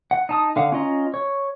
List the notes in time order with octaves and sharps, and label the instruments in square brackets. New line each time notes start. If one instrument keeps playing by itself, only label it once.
[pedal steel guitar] F#5
D#4 A5 D#6
D3 F5 F#5
C#4 F4 D#5 A#5
C#5